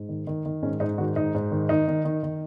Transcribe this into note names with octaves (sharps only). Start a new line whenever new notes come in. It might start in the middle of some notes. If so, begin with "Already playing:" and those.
Already playing: G#2
D#3
D#3
D#3
G#2 C#4
G#2 D#4
D#3 F#4
G#2 D#4
G#2
D#3
D#3 D#4
D#3
D#3
D#3